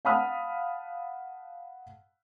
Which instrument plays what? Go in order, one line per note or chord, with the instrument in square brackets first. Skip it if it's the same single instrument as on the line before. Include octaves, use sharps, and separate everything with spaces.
[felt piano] F5 F#5 A5 B5 D#6 F6